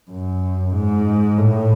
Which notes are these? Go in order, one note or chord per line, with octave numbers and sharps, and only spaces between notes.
F#2
G#2
A2